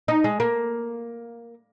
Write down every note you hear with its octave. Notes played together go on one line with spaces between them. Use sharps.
D#4
G#3
A#3